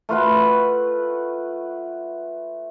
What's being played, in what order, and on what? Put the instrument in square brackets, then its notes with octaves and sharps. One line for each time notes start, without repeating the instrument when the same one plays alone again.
[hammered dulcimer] A3 F4 B4 F#5